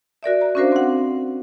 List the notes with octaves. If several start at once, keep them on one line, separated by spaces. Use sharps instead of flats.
F#4 A#4 D5 E5
A#5
C#4 D4 F#4 A#4 C5 F5
C4 F#5